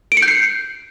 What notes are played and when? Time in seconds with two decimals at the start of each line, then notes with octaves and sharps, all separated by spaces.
0.12 D7
0.17 C#7
0.22 G6
0.28 C7